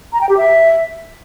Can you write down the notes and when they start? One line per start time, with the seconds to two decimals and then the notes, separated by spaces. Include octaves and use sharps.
0.13 A#5
0.21 G5
0.29 G4
0.37 E5